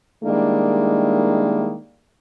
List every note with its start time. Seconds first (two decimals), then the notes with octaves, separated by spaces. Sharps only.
0.23 D#3 G3 G#3 A#3 D4 E4